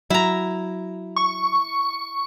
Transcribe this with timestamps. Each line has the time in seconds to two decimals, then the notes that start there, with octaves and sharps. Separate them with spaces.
0.10 F#3 E4 A#5
1.16 C#6